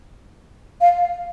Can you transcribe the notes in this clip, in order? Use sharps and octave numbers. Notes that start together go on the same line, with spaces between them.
F5